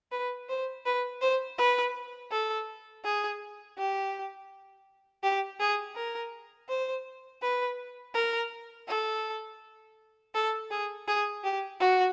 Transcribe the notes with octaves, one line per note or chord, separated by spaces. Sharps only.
B4
C5
B4
C5
B4
A4
G#4
G4
G4
G#4
A#4
C5
B4
A#4
A4
A4
G#4
G#4
G4
F#4